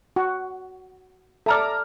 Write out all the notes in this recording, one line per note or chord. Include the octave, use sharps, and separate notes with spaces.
F#4
A4 D5 E5 A#5 F6